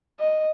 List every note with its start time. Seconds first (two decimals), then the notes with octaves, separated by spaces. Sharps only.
0.20 D#5